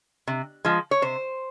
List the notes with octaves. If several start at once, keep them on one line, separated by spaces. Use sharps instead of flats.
C3
F3 G#3
C#5
C3 C5